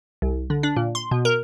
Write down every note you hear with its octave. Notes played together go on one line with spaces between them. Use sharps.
C2
D3
D4
A#2
C6
B2
A#4